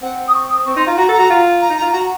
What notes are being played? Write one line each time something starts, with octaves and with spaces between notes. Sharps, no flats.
C4 F#5
D#6
C#6
D#6
C4 C#6
D#4 C6
F4 A#5
F#4 A#5
A4
A#5
F#4
F4
A#5
D#4
A#5
F4
F#4 A#5